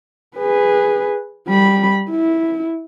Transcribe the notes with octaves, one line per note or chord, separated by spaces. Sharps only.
G#4 B4
G3 B5
E4